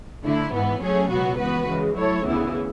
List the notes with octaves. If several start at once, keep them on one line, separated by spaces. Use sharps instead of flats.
D3 A3 E4
G#2 E3 B3
F#3 A3 C#4 G#4 C#5
C#2 B2 F#3 B3 F#4
E3 B3 F#4 B4
C#3 E3 G#3
F#3 A3 E4 A4 C#5
D2 C#3 E3 B3 E4